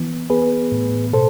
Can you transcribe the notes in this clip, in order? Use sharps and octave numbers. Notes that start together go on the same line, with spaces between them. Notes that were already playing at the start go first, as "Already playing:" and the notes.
Already playing: E3 B3
B3 G#4 B4
A2
B2 A4 C5